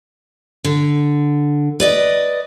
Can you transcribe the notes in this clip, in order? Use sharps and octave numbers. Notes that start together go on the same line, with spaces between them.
D3
B4 D5 D#5